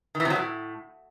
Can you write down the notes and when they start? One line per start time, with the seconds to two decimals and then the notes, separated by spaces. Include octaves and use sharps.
0.15 D#3
0.20 E3
0.25 C3
0.30 F#3
0.35 A2